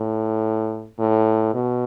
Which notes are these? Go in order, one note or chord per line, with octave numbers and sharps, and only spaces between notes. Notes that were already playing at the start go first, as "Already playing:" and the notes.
Already playing: A2
A2
B2